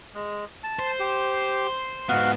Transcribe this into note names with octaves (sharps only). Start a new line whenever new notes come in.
G#3
A5
C5
G4
G#2 B3 F#4 F5